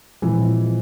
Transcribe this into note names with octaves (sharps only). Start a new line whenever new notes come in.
A#2 E3 F3 G#3 C4